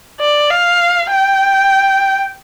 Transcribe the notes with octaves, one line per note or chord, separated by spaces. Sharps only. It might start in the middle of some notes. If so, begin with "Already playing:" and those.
D5
F5
G5